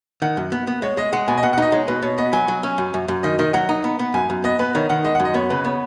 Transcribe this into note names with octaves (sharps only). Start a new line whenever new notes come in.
D#3 F#5
F#2
B3
B3
G#3 C#5
G#3 D#5
G#3 F#5
B2 G#5
D#5
B2 F#5
F#5
D#4 D#5
G#3 C#5
B2 B4
B2 C#5
B3 D#5
F#3 G#5
F#3
C#4
F#2
F#2
F#2
D#3 D#5
D#3 D#5
F#3 F#5
D#4
B3
B3
F#2 G#5
F#2
B3 D#5
B3 B4
D#3 C#5
D#3 F#5
G#3 D#5
F#5
F#2
D#5
B3 C#5
C#3 B4
B3 C#5